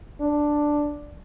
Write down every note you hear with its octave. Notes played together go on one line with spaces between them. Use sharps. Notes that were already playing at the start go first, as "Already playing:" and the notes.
D4